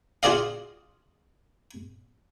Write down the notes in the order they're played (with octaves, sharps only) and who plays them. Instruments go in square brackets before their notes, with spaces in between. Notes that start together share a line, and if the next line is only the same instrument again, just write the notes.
[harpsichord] F4 F#4 G#4 D5 D#5 F5